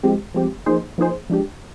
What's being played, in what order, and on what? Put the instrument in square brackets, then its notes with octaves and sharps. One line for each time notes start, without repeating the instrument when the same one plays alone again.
[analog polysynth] F3 G#3 C4 G4
F3 G#3 C4 G4
F3 A#3 D#4 G#4 C5
F3 A#3 D#4 G#4 C5
F3 G#3 D4 G4